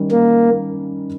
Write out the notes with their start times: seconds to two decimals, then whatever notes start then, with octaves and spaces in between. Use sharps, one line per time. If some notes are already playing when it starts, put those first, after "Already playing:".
Already playing: D#3 G3 C#4
0.11 A#3